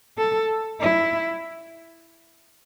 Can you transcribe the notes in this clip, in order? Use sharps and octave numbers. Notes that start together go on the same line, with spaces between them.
A4
E4